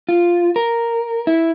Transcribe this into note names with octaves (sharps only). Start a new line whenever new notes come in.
F4
A#4
E4